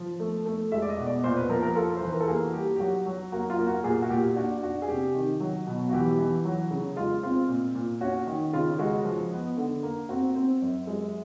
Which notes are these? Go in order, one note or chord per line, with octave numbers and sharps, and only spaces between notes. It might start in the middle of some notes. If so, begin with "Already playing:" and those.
Already playing: F3
A3
A3
G#3 E5
D5
D#5
B2
D5
A#2 C5
B4
F3 A#4
A#4
F4 A4
C5
E3 B4
A#4
A4
A#3 G#4
F#4
G3 G4
G4
F#3 F#4
F#3
A#3 F#4
F4
A#3
F#4
A#2 G#4
F#4
A#2 G4
D4 F#4
D4 F#4
G#4
C3 G4
D#3
F#3
B2
F#4
E3 G4
E3
F#3
C#3
G#3 F4
C4 F4
A#2
A#2
C#4 F#4
D#3
C#3 F4
G#3 F#4
F3
B3
D3
A#3
C4 F#4
C4
F#2
G#3